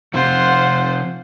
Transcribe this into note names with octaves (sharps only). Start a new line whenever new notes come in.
C3 F3 F4 C5 F#5